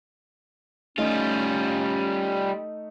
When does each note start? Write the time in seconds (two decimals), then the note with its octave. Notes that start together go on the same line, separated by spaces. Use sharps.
0.98 G3 A3 C#4 D#4 F4